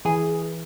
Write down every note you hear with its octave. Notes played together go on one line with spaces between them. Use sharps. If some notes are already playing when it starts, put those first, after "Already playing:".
E3 G#4